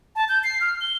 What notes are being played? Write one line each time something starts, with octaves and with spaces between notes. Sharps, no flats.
A5
G6
C7
F6
G7